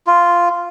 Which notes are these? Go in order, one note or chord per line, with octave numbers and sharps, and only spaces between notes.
F4